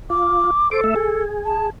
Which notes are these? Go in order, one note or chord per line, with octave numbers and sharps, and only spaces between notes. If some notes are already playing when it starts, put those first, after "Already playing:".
F4 D6
A4 C5 D6
A3 E5
G#4
A5